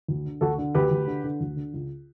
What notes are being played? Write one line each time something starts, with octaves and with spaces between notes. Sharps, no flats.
D2
D3
D2 F#4 A4
D3
D2 G4 B4
D2
D3
D3
D2
D3
C#2